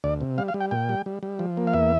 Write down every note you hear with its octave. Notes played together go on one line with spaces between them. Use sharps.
D2 D5
C3
G3 F5
F5
G3
G5
A#2 G5
G3
G3
G3
F3
A#3
F5
E2 E5